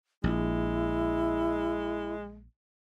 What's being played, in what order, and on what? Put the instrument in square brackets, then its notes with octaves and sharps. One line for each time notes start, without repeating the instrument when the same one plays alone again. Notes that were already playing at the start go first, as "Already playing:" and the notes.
[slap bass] A#1 [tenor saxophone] G#3 [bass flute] E4